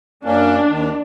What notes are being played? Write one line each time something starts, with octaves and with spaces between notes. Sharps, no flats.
F#2 A#3 C#4 D4
D#2 D#3